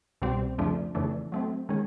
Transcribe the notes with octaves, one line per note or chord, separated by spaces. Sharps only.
C2 B2 G3 C4
F2 C#3 F3 A3 D4
F2 C#3 E3 A3 D4
F#3 A3 C4
D#3 G#3 C#4